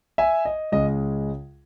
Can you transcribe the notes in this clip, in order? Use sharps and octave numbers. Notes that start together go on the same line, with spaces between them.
E5 G#5
D#5
C#2 C#3 G#3 D#5